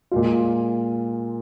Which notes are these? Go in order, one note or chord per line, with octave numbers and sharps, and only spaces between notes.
A#2 G#3 F4